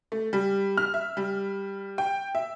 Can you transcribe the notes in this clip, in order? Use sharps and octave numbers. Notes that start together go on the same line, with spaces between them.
A3
G3
F6
E5
G3
G5
E5